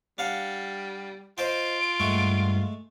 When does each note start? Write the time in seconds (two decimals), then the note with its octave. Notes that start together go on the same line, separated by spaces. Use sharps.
0.18 G3 D4 F5 F#5
1.38 F4 C5 D#5 G5 D7
2.00 G2 G#3 A3 F#5